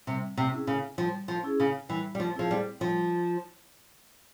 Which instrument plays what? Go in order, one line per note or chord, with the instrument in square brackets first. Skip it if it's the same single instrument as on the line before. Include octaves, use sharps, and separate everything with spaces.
[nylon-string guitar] C3 [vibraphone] G3
[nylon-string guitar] C3
[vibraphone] C#4 E4 G#4
[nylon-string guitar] C#3
[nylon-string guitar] F3 [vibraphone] G3
[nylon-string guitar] F3
[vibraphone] C#4 E4 G#4
[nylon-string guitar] C#3
[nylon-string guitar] E3 [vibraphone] G3
[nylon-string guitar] G3
F3
[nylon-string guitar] F3 [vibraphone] C4 E4 G#4 C5
[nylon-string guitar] G3
[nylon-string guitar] F3 [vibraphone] G3